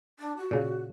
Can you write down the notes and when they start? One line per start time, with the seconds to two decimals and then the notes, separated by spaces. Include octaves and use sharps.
0.19 D4
0.37 F#4
0.51 A#2 C#3